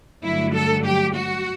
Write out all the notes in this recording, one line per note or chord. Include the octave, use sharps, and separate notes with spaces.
G2 D3 F#3 A3 E4
A4
G4
F#4